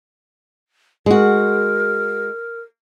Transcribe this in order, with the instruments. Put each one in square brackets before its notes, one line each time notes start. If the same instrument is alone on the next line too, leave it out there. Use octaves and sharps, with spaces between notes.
[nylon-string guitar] G#3 F#4 [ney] A#4